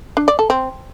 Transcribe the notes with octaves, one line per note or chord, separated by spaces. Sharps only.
D4
D5
A4
C4